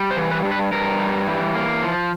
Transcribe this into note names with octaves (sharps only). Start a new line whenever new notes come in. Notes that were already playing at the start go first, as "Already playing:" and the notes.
Already playing: G3
C5
E3
B4
G2
B4
G2 A#4
G3
E3
A#3
F3